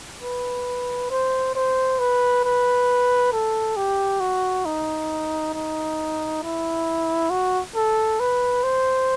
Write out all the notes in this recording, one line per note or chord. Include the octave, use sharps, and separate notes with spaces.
B4
C5
C5
B4
B4
A4
G4
F#4
D#4
D#4
E4
F#4
A4
B4
C5